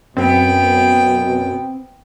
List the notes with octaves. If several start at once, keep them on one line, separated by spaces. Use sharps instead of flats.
F#2 B2 B3 C4 G5